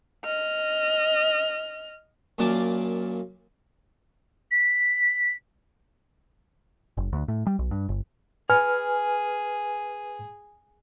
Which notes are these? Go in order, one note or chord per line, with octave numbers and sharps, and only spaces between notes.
D#5 F6
F#2 A#2 A#3 D5 A5 D6
B6
F#1
D2
A2
G3
B1
G2
G1
G#4 B4 G#5 F6